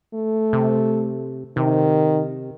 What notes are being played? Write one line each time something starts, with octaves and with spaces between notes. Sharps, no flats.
A3
C3
C3 D#3